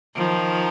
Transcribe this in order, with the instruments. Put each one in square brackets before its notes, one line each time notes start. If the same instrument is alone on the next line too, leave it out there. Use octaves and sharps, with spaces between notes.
[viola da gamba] D#3 F3